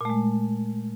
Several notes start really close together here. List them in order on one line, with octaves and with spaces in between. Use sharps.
A#2 A3 G#3